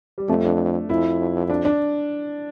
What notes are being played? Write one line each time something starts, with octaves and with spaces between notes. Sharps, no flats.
G3
F2 A3
D4
F2 E4
D4
D4